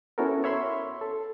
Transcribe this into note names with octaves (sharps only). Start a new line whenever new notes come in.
B3 C#4 E4 F#4 A4 A#4
C#5 E5 B5 C6
A4